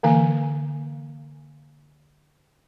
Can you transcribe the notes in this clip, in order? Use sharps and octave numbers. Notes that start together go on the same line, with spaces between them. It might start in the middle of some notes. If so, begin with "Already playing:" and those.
D3 E3 A#3 G#5